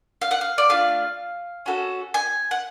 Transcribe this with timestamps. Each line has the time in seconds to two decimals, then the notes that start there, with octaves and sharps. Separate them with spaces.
0.22 F5
0.31 F#5
0.41 F5
0.58 D5
0.69 A3 D4 F4 F5
1.66 C#4 F#4 A4
2.14 G#5
2.51 F#5